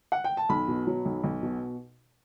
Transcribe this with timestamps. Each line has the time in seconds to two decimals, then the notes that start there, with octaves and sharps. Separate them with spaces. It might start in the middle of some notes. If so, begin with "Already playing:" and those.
0.12 F#5
0.24 G5
0.37 A5
0.49 B1 B5
0.68 B2
0.87 F#3
1.05 B1
1.24 B1
1.42 B2